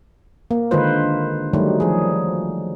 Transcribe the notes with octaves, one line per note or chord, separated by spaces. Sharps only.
A#3
D3 D#3 G#3 F4 B4 C5
D#3 F#3 G3 A3 D#4
F3 G#4